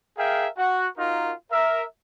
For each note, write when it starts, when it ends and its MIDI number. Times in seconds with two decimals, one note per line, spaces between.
0.18 0.49 68
0.18 0.49 70
0.18 0.49 76
0.18 0.49 77
0.18 0.49 79
0.58 0.88 66
0.58 0.88 78
0.98 1.33 63
0.98 1.33 65
0.98 1.33 66
0.98 1.33 70
1.52 1.83 70
1.52 1.83 76